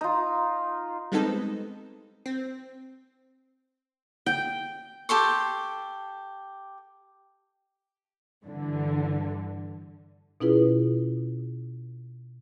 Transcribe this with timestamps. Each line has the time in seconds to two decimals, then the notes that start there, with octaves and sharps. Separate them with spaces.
0.01 D#4 F4
1.12 G3 G#3 B3 C4 D#4 A4
2.26 C4
4.26 G5
5.09 G4 A4 C6 C#6
8.44 G2 D3 E3
10.40 B2 C#4 E4 F4 G#4 B4